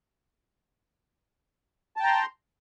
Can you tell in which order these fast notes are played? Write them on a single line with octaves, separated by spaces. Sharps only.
A5 G5 A#5 C6